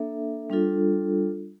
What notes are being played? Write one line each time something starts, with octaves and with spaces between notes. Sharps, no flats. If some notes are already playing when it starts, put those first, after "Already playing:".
Already playing: A#3 D4 A4 E5
G3 D4 F4 A4